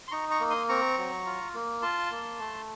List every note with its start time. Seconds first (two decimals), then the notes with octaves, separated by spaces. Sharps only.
0.08 C6
0.12 D#4 A#5 C#6
0.30 A#5 C#6
0.40 A#3
0.50 C6 D#6
0.69 C4 A#5 C#6
0.98 F#3
1.26 F4
1.54 A#3
1.82 F4 A5 C6
2.11 A#3
2.39 A3